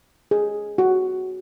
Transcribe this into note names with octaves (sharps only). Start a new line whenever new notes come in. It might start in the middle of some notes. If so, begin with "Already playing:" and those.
G#4
F#4